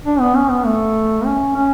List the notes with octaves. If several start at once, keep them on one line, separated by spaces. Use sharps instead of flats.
D4
B3
C#4
B3
A3
C#4
C#4